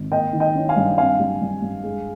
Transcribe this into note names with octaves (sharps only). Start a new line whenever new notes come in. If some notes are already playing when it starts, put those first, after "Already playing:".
Already playing: G#1
A#3 D#5 G5
D#3
D#5 G5
C#4
F5 G#5
G2
C4 F5 G#5
G3
G2
G2
G#3